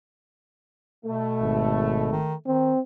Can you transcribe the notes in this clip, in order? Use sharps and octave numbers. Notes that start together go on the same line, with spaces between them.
B2 A3
G#1
D#3
D#3 C4